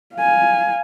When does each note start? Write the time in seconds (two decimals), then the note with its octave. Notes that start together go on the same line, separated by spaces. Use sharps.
0.15 F5 G#5